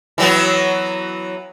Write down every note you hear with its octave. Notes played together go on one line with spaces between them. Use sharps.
E3 F#3 B3